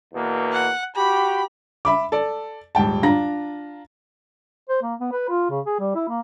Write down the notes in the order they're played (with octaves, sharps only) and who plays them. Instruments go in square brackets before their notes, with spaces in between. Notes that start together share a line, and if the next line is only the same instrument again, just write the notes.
[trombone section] E2 B2 A#3
[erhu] F#5
[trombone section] F#4 G4 [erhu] B5
[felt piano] E5 B5 D6
A4 D5
D#1 G#2 G5 A5
D4 F4 A#5 A#6
[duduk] C5
A#3
B3
B4
F4
C#3
G#4
G3
E4
A#3